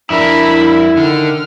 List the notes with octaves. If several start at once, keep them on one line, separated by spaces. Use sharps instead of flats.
F2 D4 E4 A#4 E5 B5
D3 D#3 F6